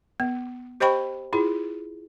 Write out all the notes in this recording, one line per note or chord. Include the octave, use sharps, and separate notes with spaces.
B3
G4 C5 D#5 G5 B5 C#6
E4 F4 G#4